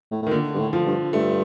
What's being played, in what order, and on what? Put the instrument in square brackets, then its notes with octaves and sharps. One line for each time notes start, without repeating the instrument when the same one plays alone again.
[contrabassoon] A2
A2
[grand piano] D#3
[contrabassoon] A#2 [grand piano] D3
[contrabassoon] G2
A2
[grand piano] F3
[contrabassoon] G2
[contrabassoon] G2 [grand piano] A3